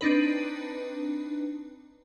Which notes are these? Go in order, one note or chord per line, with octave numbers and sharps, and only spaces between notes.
C4 D4 D#4 B4